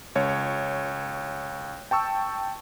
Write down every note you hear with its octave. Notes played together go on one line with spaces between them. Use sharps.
C#2 C#5
G5 A5 C#6 E6